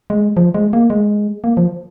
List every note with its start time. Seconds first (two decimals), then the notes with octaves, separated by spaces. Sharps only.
0.10 G#3
0.37 F3
0.54 G#3
0.73 A#3
0.90 G#3
1.44 A#3
1.57 F3